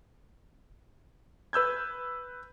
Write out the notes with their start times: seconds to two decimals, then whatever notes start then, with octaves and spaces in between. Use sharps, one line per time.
1.53 B4 E6 G6 G#6